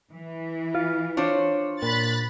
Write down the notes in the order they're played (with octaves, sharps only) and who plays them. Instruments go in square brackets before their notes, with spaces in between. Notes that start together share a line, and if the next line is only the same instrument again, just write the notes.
[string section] E3
[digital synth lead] F4
[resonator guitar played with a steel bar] D4 F4 C5 [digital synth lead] C#5
[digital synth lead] A#2 [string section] B5 F#6 A6